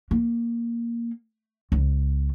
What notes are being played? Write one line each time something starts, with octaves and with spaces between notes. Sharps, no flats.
A#3
C#2